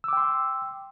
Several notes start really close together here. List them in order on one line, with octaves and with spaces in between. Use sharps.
E6 D6 G5 C6